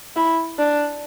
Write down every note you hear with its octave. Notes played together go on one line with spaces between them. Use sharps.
E4
D4